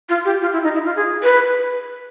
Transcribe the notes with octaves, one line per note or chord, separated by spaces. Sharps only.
F4
G4
F4
E4
D#4
E4
F4
G#4
B4